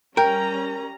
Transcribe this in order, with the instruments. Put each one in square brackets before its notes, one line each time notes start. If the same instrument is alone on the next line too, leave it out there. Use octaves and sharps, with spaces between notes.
[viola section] G3 C#4 A#5 [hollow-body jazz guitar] A#4 [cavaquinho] G5